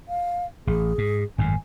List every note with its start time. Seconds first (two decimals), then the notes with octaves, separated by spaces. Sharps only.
0.09 F5
0.67 A1 G#4
0.98 G#2
1.38 G#1 F#2 A2 G#5